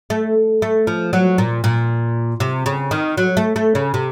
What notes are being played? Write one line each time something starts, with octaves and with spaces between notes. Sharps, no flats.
A3
A3
F3
F#3
A#2
A#2
C3
C#3
D#3
F#3
A3
A3
C#3
C3